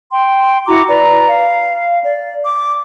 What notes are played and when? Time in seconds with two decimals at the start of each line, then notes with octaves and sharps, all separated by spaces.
0.11 G5 C6
0.66 E4 F#4 A#5 D6
0.88 B4 D5 A#5
1.28 F5
2.04 D5
2.44 D6